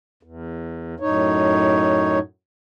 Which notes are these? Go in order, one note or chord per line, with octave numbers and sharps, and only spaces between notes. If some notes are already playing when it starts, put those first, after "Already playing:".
E2
F#2 A2 D#4 C#5